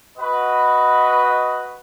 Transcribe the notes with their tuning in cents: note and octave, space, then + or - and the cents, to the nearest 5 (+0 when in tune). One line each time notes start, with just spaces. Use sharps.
F#4 +0 B4 +0 D#5 +10